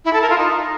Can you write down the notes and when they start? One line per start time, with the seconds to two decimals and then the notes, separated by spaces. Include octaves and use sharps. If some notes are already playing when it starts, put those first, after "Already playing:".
0.05 E4
0.13 A4
0.22 A#4
0.30 F4
0.38 D#4